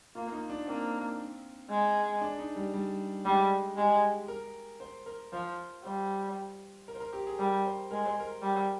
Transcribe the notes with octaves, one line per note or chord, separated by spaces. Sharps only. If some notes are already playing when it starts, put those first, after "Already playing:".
A#3 F4
D#4
D4
A#3 C4
G#3
D4
D#4
G3
G3
G3 G#3
G#3 G4
A#4
C5
A#4
F3 C5
G3 C5
A#4
C5
A#4
G4
G#4
G3 A#4
C5
G#3 A#4
C5
A#4
G3